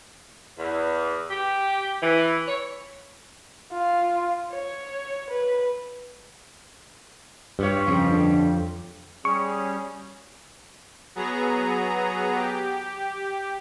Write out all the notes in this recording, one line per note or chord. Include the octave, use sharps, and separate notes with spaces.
E2
G4
E3
C#5
F4
C#5
B4
G2 G3 F4 C#5
F2 C#3
D3
G3 C#4 G#4 C#6
F#3 B3 G#4 A#5
G4